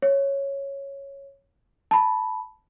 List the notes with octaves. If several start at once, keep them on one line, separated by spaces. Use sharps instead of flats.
C#5
A5 B5